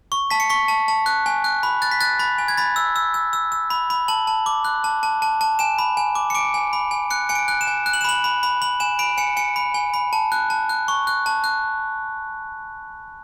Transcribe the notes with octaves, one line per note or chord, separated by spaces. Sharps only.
C#6
A5 B6
C#7
C#6 B6
A5
A5
F#6
G#5
F#6
B5
F#6 A6
B6
F#6 A6
B5 A6
G#5
G#6
B5 A6
E6
E6
E6
E6
E6
B5
B5
A5 F#7
A5
D6
F#6
A5
A5
A5
A5
G#5 E7
B5
G#5
D6
C#7
D6 D7
G#5
B5
G#5
F#6 C#7
G#5 C#7
D7
F#6
E7
G#5
F#6
F#7
E7
B5 F#7
B5
B5
B5 F#7
G#5 E7
B5 D7
G#5 C#7
G#5 C#7
B5
G#5
B5
A5
F#6
A5
F#6
C#6
F#6
A5
F#6